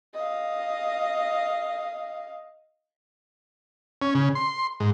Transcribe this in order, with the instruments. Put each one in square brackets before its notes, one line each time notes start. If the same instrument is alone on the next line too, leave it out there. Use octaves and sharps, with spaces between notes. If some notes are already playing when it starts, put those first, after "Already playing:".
[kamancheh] D#5 F5
[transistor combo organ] C#4
C#3
C6
G#2